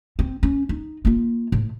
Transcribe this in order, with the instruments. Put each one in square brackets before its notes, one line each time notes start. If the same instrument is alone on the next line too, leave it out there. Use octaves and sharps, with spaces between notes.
[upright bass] C4
C#4
D#4
A#3 F4
A2